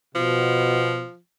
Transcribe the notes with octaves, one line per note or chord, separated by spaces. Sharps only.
B2 F3